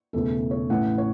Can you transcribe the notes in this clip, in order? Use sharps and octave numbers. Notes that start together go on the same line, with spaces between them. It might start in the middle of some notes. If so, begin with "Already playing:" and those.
E1 E2 C#3 A3 A4
C#5
A1 A2 E3 F#5
C#5